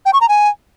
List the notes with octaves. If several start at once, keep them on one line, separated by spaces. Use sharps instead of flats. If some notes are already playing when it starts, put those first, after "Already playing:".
G5
C#6
A#5
G#5